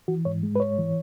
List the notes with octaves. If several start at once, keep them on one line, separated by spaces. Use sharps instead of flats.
E3 F#4
G#2 C#5
G#3
B4
G#2 C#5
E3